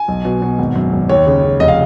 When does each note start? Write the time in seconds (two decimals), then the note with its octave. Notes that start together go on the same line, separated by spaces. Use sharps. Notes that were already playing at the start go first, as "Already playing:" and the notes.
Already playing: G#5
0.08 B1
0.25 B2
0.42 B2
0.59 G#1
0.76 F#2
0.93 G#1
1.09 D#2 C#5
1.27 C#3
1.43 C#3
1.60 F1 D#5
1.68 F5